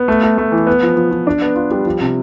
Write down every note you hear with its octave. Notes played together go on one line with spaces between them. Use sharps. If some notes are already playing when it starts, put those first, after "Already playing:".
Already playing: B3
A3
A3
A3
E3
B3
F3
F3
F3
D4
B3
F4
G3
F3
C3